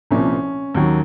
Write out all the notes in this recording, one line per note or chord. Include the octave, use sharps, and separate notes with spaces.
C2 A#2 F3 C#4
D#2 D#3 F#3